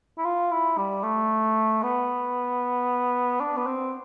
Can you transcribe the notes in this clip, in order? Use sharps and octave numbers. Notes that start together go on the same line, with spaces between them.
E4
F4
E4
G3
A3
B3
D4
B3
C4